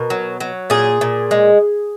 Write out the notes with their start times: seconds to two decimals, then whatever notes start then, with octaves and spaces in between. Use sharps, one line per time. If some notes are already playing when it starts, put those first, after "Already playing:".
Already playing: B2 A#4
0.10 F#3
0.40 F#3
0.70 A#2 G#4
1.01 A#2
1.31 G#3